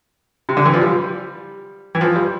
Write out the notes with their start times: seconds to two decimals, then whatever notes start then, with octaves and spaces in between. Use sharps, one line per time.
0.49 C3
0.57 D3
0.65 E3
0.74 F3
0.81 G3
1.95 E3
2.01 F3
2.16 G3